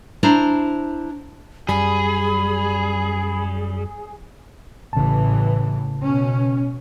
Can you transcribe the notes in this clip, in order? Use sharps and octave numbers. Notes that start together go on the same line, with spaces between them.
D4 E4 C5 A#5
F#2 G3 G#4 B5
A1 A2 C#3 E3 A5
B2 C#4